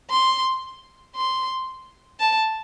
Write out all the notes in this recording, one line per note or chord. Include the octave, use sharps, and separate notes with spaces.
C6
C6
A5